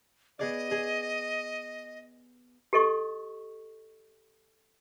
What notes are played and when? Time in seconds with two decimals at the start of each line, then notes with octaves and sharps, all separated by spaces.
0.39 B3 G#4 D5 D#5
0.71 G#4
2.73 G4 A4 D#5 C#6